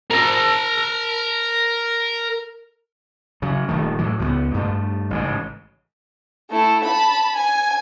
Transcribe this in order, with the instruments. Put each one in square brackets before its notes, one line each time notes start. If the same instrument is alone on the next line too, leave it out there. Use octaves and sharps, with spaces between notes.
[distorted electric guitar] A#4 A5
[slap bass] C#3 F#3
D#1 D#3 A3
A2 E3 F#3
C#2 G3 B3
G2 A3
A1 G#2 C#3
[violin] A3 E4
A5 B5
G#5